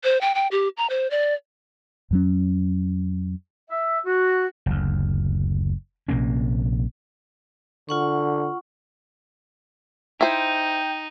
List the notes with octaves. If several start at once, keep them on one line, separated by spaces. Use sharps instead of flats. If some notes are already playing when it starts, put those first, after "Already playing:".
C5
G5
G5
G4
A#5
C5
D5
F2 F#3 C#4
E5
F#4
F#1 D2
A#1 C3 A#3 C#4
D3 F4 F#5 C#6
D#4 E4 C5 G5